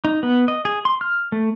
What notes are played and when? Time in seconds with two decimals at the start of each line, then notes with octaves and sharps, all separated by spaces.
0.05 D#4
0.23 B3
0.48 D#5
0.65 G#4
0.85 C6
1.01 F6
1.32 A3